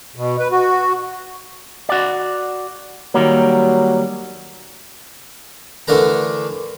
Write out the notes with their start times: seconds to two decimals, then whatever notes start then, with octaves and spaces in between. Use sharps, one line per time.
0.16 B2
0.40 B4
0.51 F#4
1.89 F#4 D5
3.14 D#3 F#3 G3 A#3
5.88 D3 E3 A3 D4 A#4 A#5